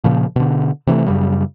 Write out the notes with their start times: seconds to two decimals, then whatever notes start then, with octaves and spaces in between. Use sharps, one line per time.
0.04 A#2 C#3 F3
0.36 B2 D3
0.87 C3 E3 F3 A3
1.06 F#2 C#3 G3